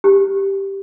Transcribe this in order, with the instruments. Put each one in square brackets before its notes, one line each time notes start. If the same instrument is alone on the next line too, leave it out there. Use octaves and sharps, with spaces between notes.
[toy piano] G4